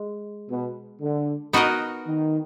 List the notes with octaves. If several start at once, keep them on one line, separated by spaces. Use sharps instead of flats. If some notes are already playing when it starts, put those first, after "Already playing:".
Already playing: G#3
B2
D3
B3 D#4 F#4 A#4 D#5
D#3